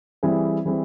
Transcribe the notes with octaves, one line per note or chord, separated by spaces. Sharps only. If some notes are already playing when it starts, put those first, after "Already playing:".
E3 G3 C4 E4 G#4
E3 G3 C4 E4 G#4